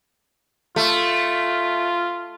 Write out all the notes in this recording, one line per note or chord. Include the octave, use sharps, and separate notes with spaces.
A3 F4